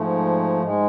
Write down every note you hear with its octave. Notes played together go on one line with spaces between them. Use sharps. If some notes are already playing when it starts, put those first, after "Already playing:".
Already playing: G#2 F3 A3
G#2 G#3